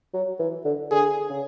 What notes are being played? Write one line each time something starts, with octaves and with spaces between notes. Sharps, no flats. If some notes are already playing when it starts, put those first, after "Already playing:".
F#3
E3
D3
D3 G#4
C#3